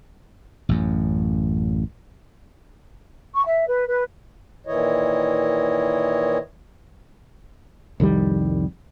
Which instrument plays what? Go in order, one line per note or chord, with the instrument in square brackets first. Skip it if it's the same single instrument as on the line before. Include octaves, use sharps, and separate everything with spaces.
[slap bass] A1 F#2
[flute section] C#6
E5
B4
B4
[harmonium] A#2 D#3 E3 E4 C#5 D#5
[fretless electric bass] C2 F2 D#3 G3